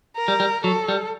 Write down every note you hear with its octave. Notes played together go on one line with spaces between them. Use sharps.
A#4
G3
G3
F#3 A4
G3